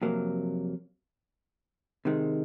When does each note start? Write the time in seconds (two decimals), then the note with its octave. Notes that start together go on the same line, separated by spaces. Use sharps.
0.02 F2 C3 F#3 A#3
2.05 C3 D#3 G#3